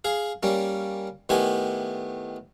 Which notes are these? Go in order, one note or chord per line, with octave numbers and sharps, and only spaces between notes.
G#4 F5
G3 A#3 C#4
A2 D#3 B3 G4 G#5